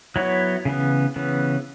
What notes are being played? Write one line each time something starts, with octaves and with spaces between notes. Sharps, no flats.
F#3 B3 E4 C#5
C#3 E3 B3
C#3 E3 B3